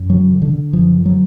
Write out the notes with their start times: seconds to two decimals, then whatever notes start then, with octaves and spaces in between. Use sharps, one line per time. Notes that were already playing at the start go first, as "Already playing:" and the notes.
Already playing: F#2
0.10 D3 F#3
0.31 D3
0.42 D3
0.53 D3
0.73 F#2 F3
0.95 D3
1.06 F#3